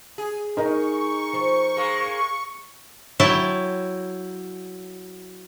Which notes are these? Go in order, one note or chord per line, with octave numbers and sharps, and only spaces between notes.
G#4
G#3 D#4 A#4 D#5 E5 C#6
F3 C5
G#3 A#3
F#3 E4 G5 A5